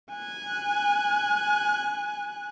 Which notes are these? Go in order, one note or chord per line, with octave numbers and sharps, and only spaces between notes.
G#5 F#6